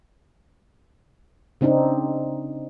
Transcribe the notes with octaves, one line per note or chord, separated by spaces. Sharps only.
C#3 C4 D4 D#4